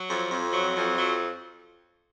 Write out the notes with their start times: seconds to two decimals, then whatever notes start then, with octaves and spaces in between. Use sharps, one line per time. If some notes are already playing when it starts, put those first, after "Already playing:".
Already playing: F#3
0.08 F2
0.30 F2
0.53 F#3
0.75 F2
0.96 F#3